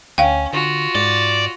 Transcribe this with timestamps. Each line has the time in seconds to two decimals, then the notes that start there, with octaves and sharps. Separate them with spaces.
0.18 D2 C#4 F5 G5
0.53 D3 F4 F#4
0.95 G#2 D5